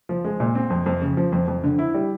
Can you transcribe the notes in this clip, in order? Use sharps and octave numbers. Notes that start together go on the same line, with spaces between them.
F3
G#3
A#2
C4
F2
F2
C#3
F3
F2
F2
D3
E4
G3